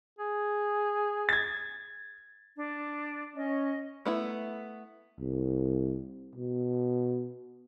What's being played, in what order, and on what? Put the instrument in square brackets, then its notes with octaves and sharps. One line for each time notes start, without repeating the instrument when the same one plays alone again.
[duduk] G#4
[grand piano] G#6 A6
[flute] D4
[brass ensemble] C#4 [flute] D#5
[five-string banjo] A3 B3 E4
[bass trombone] C2
B2